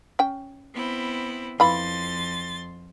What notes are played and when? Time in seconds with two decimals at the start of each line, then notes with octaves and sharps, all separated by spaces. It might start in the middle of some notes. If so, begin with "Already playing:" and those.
0.19 C#4 G5
0.75 B3 C4 E4
1.60 F2 E3 F4 B5 C6 A6